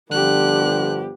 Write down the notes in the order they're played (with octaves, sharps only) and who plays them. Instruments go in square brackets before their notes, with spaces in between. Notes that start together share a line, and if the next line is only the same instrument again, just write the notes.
[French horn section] G2 F3 [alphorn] D3 [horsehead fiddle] B3 G4 [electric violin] F#6